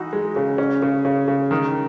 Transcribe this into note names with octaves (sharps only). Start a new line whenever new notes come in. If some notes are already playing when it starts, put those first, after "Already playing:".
Already playing: E3 D#4 F#4
G#3
C#3
C#4
C#3
C#3
C#3
D#3